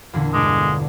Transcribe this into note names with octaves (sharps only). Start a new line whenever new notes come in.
E2 A#2 D3
G1 B2 G#3 D6